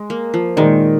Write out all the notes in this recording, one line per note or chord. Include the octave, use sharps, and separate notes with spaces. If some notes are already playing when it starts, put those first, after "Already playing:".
Already playing: G#3
A#3
F3
A#2 D#3 G#3 D#4 A#4 D5